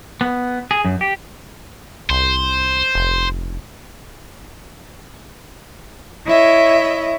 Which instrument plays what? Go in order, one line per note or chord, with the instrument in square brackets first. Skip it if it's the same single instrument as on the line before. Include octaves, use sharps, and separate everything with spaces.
[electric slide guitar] B3
G#4
F#2
G4
[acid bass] C2 [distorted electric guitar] C5
[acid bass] F1
[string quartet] E4 C#5 D#5 E5